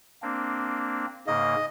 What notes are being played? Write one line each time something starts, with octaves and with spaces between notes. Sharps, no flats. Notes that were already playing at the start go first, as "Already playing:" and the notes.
A#3 C4 D4
G#2 C#3 A#3 D#5